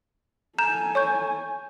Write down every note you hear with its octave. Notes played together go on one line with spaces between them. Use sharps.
A4 G#5 A#5 G6 E7
C#5 C#6 G6